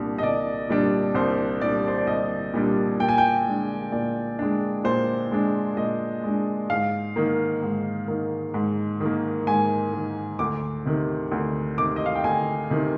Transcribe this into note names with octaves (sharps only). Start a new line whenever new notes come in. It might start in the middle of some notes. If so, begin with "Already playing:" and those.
Already playing: C2 A#2 G3 D4
D#5
C2 D5
A#2 G3 D4
C2 C5
A#2 G3 D4 D5
C5
D5
C2 D#5
A#2 G3 D4
A#2 G5
G#5
G5
G#3 D4
A#2 D5
G#3 D4
A#2 C5
G#3 D4
A#2 D#5
G#3 D4
G#2 F5
D#3 A#3
G#2
D#3 A#3
G#2
D#3
A#3
G#2 G#5
D#3 A#3
D2 D6
C3 D#3
D2
C3 D#3 D6
D#5
F5
G5
D2 G#5
C3 D#3